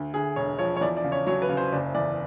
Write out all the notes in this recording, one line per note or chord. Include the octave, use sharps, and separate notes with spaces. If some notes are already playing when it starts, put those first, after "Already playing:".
Already playing: D2
D2 G#4
E1 C#5
F3 C#5
C#5
E2 D5
D5
C#3
C#5
F#3 C#5
B4
C#3
C5
F#1 D5
E2 D5